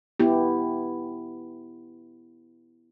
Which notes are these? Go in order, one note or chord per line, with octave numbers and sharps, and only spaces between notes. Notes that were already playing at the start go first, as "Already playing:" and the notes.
B3 E4 G4